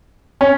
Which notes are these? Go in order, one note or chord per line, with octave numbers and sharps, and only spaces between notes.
C#4